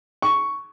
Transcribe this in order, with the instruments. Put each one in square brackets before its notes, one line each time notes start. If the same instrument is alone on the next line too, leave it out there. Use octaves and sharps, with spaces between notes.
[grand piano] C#6